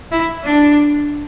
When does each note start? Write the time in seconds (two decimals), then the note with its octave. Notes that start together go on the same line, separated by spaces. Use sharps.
0.12 E4
0.44 D4